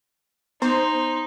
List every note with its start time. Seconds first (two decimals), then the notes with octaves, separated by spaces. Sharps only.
0.62 B3 D#4 C5